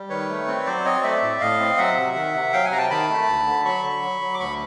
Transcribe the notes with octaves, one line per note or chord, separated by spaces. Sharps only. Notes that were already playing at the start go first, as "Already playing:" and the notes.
Already playing: G3
D#3 B4 C#5
A3
C4
F#3 C5 D5
C4 C#5 D#5
A3 D5 E5
A2
A2 D#5 F5
C4
F#3 E5 F#5
C3
D#3
C3
F#3 F5 G5
F#5 G#5
C3 A#5
G5 A5
D#3 A5 B5
A3
D2
D3
F#3 B5 C#6
D3
F#3
F#3
D6
D2 B5 C#6